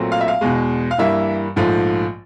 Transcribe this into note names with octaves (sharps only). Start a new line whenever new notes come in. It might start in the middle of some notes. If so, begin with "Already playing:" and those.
Already playing: A#1 A#2 F#3 A3 C4
F5
E5
F5
E2 B2 G#3
F5
G2 E3 G3 A#3 E5
A#1 G#2 F3 A3